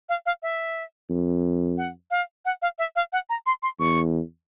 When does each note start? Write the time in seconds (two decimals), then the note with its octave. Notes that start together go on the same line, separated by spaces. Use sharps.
0.09 F5
0.26 F5
0.42 E5
1.10 F2
1.78 F#5
2.11 F5
2.45 F#5
2.62 F5
2.78 E5
2.96 F5
3.13 F#5
3.29 A#5
3.46 C6
3.63 C6
3.79 E2 C#6